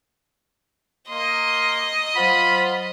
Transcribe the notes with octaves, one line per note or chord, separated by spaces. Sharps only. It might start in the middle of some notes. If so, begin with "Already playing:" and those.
A#3 D#5 C6
F#3 F4 C5 F#5 B5